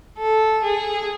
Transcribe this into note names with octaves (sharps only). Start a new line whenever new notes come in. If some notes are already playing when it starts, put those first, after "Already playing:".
A4
G#4